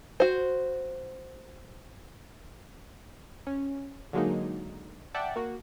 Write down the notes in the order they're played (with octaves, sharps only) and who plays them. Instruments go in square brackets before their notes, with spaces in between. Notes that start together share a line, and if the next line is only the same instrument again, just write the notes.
[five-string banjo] F#4 C5
[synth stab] C#4
D3 F#3 G#3 A#3 D#4
D5 E5 F#5 G5 A5
A#3 F#4